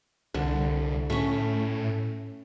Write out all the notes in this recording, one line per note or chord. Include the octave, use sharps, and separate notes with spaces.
C2 D3
A2 A3 C#4